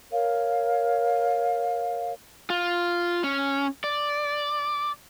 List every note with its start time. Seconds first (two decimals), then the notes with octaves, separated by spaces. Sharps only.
0.11 A#4 C#5 F5
2.50 F4
3.24 C#4
3.84 D5